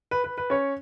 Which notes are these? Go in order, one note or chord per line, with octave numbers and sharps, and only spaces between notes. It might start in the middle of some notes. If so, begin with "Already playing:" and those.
B4
B4
B4
C#4 C#5